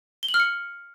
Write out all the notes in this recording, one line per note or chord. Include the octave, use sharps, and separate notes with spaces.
G7
F#7
F6
C#7